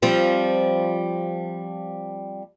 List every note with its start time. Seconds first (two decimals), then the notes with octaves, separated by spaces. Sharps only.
0.02 F3 G3 C4